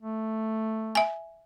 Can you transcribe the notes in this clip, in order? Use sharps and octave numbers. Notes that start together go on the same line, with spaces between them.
A3
E5 G#5